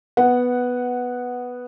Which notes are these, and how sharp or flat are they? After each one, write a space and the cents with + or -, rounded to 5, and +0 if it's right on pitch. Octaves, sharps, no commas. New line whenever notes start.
B3 +0 F#5 +0